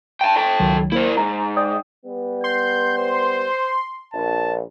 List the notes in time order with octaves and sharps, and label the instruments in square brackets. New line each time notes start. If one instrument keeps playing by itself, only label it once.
[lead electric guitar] G5 A5
A4 G5
[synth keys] C#2 D#3 F#3
[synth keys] A#3 C5 [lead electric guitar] E4 A#4
[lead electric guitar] G#2 [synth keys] A#5
[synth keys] D5 G5 D#6
[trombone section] G3 B3
[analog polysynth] C6 [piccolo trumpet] G6
[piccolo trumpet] C5
[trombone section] A#1 [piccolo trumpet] A5